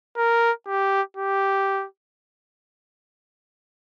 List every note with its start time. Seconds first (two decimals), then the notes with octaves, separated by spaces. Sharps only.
0.17 A#4
0.67 G4
1.17 G4